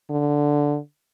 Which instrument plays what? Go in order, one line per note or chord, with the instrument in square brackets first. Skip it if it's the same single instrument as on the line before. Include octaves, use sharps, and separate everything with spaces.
[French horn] D3